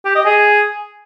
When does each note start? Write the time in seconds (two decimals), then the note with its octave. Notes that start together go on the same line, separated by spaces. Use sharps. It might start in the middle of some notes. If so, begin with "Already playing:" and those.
0.05 G4
0.15 D#5
0.25 G#4